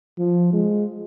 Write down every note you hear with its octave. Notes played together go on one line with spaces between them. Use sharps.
F3
G#3